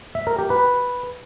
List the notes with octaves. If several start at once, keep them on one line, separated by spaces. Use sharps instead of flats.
E5
A#4
G4
B4